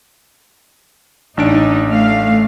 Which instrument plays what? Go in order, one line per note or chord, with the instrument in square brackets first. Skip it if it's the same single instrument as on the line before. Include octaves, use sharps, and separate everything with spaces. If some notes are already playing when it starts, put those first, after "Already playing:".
[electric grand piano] A1 D4 D7 [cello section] D#4
[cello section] A3 F5